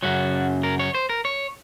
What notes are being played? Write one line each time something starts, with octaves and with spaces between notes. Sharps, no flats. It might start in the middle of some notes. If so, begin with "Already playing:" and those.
F#2 C#3 F#3 F#4
A#4
C#5
C5
A#4
C#5